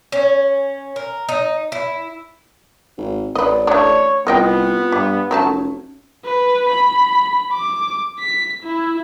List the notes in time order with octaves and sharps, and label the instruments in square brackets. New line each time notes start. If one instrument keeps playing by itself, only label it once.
[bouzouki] C#4
A#4
D#4
E4
[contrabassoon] G#1
[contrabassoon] A1 [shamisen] B4 D#5 [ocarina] D5
[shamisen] A3 D4 [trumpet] C#5
[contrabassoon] C2 [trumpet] B3 [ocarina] F4 [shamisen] A#4 D#5 G5
[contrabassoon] G2 [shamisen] G4
[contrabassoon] F1 [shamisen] F#3 A3 A5 [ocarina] C#4
[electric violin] B4
B5
D6
B6
E4